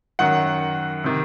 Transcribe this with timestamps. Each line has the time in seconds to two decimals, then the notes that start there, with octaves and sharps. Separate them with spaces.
0.19 F#2 D#3 F#3 F#5
1.04 C3 D#3